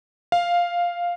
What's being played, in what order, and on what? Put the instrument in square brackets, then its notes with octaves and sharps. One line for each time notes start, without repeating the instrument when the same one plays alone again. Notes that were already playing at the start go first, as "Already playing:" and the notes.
[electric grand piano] F5